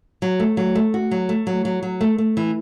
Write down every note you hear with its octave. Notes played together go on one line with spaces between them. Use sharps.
F#3
A3
F#3
A3
F#4
F#3
A3
F#3
F#3
F#3
A3
A3
E3